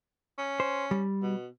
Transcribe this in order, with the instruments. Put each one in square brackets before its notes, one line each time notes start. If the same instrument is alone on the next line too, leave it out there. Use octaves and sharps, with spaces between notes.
[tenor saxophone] C#4
[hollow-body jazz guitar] C5
G3
[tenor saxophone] B2